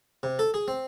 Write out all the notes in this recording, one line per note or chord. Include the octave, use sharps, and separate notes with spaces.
C3
A4
G#4
C4